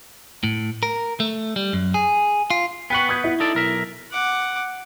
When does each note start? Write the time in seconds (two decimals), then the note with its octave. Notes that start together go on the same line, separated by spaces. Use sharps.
0.44 A2
0.83 A#4
1.20 A3
1.56 G3
1.73 F#2
1.94 G#4
2.50 F4
2.90 B3 B4 F#5 G5 C#6
3.09 D#6 G6 G#6
3.24 E4
3.40 D#4 A4 D5
3.55 B1 A#4 E5
4.11 F#5 D6